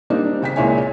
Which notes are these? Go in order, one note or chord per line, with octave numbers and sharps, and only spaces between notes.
G3 A#3 C4 D4 D#4
C#3 G5 B6
C#2 A#2 G#3 E4 C#5 G#5